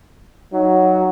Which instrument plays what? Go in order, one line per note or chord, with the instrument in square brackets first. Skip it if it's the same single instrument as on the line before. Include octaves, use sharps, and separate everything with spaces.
[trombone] F#3 [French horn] D#4